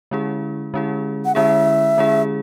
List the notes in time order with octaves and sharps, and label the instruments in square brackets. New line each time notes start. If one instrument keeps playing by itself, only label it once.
[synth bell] D3 G#3 C#4 E4 G#4
D3 G#3 C#4 E4 G#4
[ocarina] F#5
[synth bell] D3 G#3 C#4 E4 G#4 [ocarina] E5
[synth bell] D3 G#3 C#4 E4 G#4